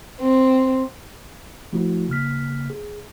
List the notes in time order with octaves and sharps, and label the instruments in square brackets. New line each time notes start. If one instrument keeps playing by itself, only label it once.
[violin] C4
[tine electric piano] F3 A3 E4 F#4
C#3 A#3 F6 B6
G#4